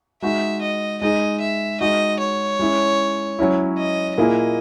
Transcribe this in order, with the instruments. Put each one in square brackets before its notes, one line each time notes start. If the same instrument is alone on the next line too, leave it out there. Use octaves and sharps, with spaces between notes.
[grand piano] G#3 D#4 F#4 [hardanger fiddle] E5
[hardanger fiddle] D#5
[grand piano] G#3 D#4 G#4 [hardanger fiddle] D#5
[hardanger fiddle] E5
[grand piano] G#3 D#4 F#4 [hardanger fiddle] D#5
[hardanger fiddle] C#5
[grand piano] G#3 C#4 E4
F#3 C#4 E4
[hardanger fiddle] D#5
[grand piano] A#2 A#3 E4 G#4 [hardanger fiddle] D#5